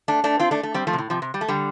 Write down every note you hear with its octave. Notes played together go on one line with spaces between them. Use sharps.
A3 D4
A3 D4
C4 F4
A3 D4
A3
G3 C4
F3 A3
C3
A2
C3 F3
C3
G3
A3
D3 G3